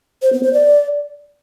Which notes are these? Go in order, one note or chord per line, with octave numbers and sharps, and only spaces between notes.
C5
B3
C5
D5